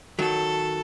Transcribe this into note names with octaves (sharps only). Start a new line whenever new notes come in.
D#3 F#3 A4